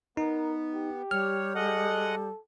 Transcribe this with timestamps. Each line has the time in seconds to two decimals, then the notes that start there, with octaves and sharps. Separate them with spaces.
0.17 B3 D#4 A#4
0.74 G4
1.11 G3 C#5 F6
1.55 G#3 A4 D#5 F#5